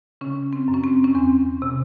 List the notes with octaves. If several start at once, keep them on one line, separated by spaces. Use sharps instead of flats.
C#3 C#4
C4
F#2
C#4
C4
C#4
E2 C4
C3